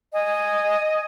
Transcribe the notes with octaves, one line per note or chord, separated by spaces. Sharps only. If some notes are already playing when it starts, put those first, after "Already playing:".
D#5 G#5